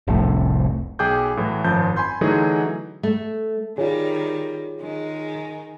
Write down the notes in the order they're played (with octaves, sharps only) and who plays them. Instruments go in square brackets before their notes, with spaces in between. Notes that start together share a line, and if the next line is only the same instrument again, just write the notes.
[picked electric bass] F1 C2 A2
[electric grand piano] B1 G#4 G5 G#5 D6 G6
A2 E3 F#3
G#1 F#2 F3 A5 G6
G#5 B5 C6 G6
D3 E3 F#3 A3 D#4 G#4
[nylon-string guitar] A3
[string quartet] D#3 G3 [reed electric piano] F4 G#4 [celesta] C#5
[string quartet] D#3 G#3